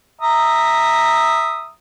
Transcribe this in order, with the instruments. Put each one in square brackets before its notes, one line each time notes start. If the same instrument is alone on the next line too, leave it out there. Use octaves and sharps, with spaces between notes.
[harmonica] E5 A#5 D#6